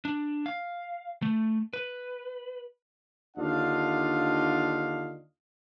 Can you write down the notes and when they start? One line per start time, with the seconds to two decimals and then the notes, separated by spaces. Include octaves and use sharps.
0.05 D4
0.46 F5
1.22 A3
1.73 B4
3.37 D#2 D3 D4 F4 D#5 F5